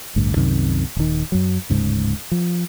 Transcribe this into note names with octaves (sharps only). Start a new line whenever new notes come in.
A1 D2 G2
C2 F#2 C3 D#3
D#1 D#3
F#2 F#3
D1 G#1 G#2 C#3
F3